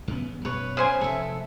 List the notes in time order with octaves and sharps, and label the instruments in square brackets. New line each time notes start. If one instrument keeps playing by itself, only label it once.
[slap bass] E2 C#3 B3
[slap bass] F#2 B2 [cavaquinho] B4 C#5
[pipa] C#3 C5 G#5
[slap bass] F1 [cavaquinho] A4 E5